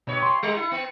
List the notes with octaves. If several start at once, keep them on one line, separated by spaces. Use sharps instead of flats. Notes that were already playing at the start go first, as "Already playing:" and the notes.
G2 B2 C#5
C6
G3
E4 C#7
B3